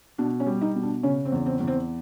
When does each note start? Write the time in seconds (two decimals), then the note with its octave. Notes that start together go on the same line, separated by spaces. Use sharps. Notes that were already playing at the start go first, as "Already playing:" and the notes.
0.18 B2 D4
0.40 C#4
0.46 G3
0.61 D#4
0.76 B2
0.83 D4
1.03 C#3 C#4
1.25 C4
1.32 E2
1.46 C4
1.60 E2
1.67 C4